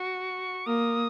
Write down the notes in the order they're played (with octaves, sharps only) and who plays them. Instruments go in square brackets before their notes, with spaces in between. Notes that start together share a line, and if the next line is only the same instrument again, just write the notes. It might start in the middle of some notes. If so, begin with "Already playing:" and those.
Already playing: [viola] F#4 [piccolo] C#6
[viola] A#3 [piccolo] D#6